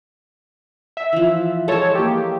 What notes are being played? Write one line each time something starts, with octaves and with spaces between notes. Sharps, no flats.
E5
E3 F3
G#3 A4 C#5 A5
A#3 G4